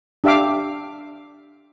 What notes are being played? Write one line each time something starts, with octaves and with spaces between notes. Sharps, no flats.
D4 G4 E5 F5 D6